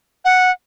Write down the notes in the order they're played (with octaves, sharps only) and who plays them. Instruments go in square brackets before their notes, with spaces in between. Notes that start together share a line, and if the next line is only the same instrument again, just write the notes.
[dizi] F#5